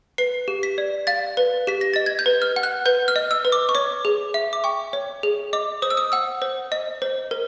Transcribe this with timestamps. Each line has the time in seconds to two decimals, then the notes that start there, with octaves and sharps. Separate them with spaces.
0.18 B4 C7
0.48 G4
0.63 B6
0.78 D5
1.07 F5 A6
1.37 B4
1.67 G4 B6
1.81 A#6
1.94 D#5 A6
2.06 G#6
2.19 G6
2.26 B4
2.42 F6
2.56 F#5
2.63 F#6
2.86 B4 G6
3.08 F6
3.16 D#5
3.31 E6
3.45 B4
3.52 D6
3.69 C#6
3.75 C#5 D6
4.05 G#4
4.34 E5
4.53 D6
4.64 G5 C#6
4.93 C#5
5.23 G#4
5.53 D#5 D6
5.82 C5 D#6
5.90 E6
5.97 D#6
6.12 F#5 E6
6.42 C5
6.72 D#5
7.02 C5
7.31 A#4